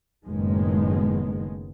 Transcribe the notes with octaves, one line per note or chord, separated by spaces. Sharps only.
F#1 A2 D#3 G#3 B3